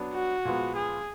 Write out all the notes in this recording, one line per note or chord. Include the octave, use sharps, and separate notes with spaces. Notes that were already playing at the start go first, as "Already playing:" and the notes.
Already playing: F#3 B3 D4
F#4
A#2 F3 G#3 B3
G#4